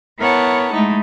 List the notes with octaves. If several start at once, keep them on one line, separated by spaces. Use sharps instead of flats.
B3 E4 A#4 C#5 F#5 A5
G#3 A3 D#4 E4